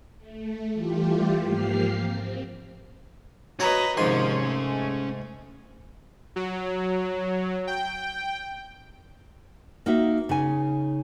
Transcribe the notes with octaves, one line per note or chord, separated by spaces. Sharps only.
A3
E3 G3 A3 F4 G4
G#2 F3 A#3 G4 F6 C7
C4
F#4 B4 C#5 D#5 A#5
G#2 C3 D#3 F3 C#4 G#5 C6
G#3 A3
F#3
G5
A#3 D#4 F#4 E5
C#3 D#4 G#5